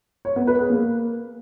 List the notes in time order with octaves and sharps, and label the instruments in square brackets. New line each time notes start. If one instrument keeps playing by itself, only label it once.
[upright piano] C#5
B3
B4
G#4
A#3